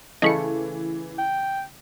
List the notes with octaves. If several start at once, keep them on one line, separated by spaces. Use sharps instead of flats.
C#3 E3 A3 D#5 B5 C#7
G5